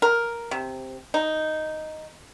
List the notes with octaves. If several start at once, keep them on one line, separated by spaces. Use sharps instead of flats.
A#4
C3
D#4